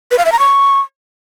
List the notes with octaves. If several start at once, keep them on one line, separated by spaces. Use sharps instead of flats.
B4
F5
E5
A#5
C#6